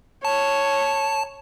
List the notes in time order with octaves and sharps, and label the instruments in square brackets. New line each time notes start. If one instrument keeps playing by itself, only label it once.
[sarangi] C#5 [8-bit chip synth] A5